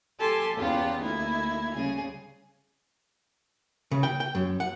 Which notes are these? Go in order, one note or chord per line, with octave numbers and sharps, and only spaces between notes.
G4 A4 G#5 A5 C6
E2 C#3 B3 F4 G4 F#5
D2 A#3 D#4 E4 G#6
C#3 G3 G#4
C#3
G5
G5
F#2
F#5